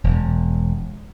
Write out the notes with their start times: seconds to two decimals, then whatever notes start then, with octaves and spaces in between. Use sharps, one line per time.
0.04 E1